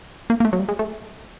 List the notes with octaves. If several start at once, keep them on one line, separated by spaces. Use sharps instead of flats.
A#3
A#3
A3
F#3
G3
G#3
A3